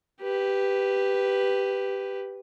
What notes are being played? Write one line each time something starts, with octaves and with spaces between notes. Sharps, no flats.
G4 B4